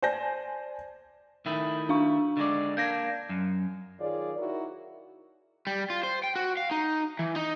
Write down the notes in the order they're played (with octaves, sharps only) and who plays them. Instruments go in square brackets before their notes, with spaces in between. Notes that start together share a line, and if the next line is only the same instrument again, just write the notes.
[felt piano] C5 D5 G#5 A5 G6 A#6
[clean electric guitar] D#3 A3 E4
[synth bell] D4 F5 C#6
[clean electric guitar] D3 G#3 D5
[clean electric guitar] A#3 D4 [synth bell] G6 G#6 A#6
[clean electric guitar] F#2
[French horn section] D#3 F4 G#4 C#5 D5
D#4 E4 F#4 A#4
[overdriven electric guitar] G3
F4
C5
G5
F#4
F5
D#4
E3
D#4